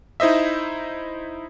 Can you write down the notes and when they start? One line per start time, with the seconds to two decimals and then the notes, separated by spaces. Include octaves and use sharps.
0.20 D#4 E4 C5 D#5 E5